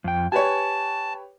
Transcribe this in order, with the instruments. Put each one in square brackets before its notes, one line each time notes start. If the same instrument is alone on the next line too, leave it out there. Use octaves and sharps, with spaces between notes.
[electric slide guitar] F2 G5
[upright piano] G4 B4 C#5 [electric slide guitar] G#5 [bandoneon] A5